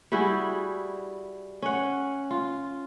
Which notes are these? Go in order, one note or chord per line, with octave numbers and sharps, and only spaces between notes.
G3 E4 F#4 G#4
C#4 F#5
F4